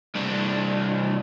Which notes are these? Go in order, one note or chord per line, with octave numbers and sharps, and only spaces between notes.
C2 D4